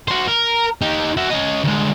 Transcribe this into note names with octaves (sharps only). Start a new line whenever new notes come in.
F#4 C5
A#4
D#4 G4
F#4 E5
C#4 D#5
D2 G#3